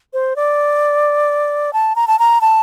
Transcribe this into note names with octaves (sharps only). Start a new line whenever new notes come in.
C5
D5
A5
A#5
A5
A#5
A5